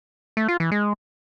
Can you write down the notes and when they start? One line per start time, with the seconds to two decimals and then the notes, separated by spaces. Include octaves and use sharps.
0.37 A3
0.48 F4
0.60 E3
0.71 G#3